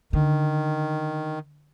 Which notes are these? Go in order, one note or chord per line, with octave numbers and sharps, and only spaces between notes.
D3 D#3